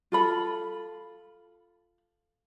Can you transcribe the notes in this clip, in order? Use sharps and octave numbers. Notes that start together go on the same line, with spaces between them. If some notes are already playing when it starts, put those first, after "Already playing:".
F4 A4 B5